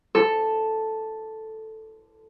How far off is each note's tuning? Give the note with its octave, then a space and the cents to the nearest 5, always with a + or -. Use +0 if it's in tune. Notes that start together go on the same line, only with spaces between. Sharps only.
A4 +0